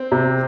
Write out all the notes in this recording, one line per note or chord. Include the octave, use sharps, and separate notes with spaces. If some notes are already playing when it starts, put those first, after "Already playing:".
Already playing: C4
C3